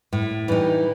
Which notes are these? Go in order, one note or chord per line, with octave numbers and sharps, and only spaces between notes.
A2
E3 G3 D#4